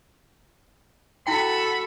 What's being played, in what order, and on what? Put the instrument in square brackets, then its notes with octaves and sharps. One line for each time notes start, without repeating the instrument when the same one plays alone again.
[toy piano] E4 F#5 G5 [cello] F#4 A4 [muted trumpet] B5